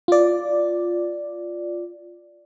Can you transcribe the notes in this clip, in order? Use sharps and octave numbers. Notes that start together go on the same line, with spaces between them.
F4 D5